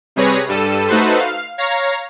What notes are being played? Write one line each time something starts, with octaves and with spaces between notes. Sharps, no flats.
C3 G3 G#4 B4 C#5 A#6
G2 G3 A4 D#7 E7
A3 D#4 F#4 A4 B4 C5
F5
C#5 F5 A#5